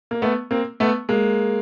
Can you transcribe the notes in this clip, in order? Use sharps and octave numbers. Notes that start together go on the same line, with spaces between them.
A#3
A3 B3
A#3 C4
A3 B3
G#3 A#3